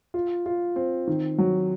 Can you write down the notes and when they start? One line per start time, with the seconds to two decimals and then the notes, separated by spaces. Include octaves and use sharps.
0.14 F4
0.46 F4
0.76 C4
1.07 D#3
1.38 F#3